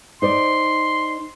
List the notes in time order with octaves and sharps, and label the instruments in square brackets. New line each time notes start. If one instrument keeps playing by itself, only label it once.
[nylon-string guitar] D#4 C5 D5 [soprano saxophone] C6